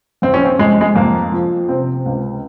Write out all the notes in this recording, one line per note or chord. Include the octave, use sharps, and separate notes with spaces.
F2 C4
C#4
C4
F2 G#3
G#3
F2 A#3
F3
C3 C4
C#2